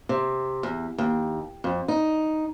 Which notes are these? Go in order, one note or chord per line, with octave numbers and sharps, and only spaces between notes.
C3
E2
D#2
F2
D#4